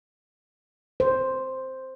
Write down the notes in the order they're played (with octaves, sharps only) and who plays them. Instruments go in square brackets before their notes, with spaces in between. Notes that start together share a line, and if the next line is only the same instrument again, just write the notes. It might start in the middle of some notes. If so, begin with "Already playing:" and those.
[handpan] C5